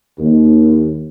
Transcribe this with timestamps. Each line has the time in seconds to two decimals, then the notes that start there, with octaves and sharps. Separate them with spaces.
0.19 D#2